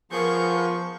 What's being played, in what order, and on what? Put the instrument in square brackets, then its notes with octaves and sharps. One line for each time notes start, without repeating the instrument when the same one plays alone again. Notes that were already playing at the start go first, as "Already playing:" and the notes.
[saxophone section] F3 [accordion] B3 G#4 G6 [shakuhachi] A#4 [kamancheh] C#6